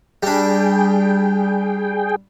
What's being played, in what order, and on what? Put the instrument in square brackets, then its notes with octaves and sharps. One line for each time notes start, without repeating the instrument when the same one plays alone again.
[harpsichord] G3 D4 [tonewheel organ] G#4 G5